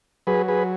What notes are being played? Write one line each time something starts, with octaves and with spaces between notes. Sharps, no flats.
F#3 G#4 B4
G#4 B4